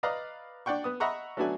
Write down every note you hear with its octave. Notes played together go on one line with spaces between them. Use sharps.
B4 D5 D#5 F5 A#5
D4 D5 F#5 G5 C#6
B3 D#6
D#5 E5 F#5 A#5 B5 C#6
F#3 A3 B3 D4 F#4 G#5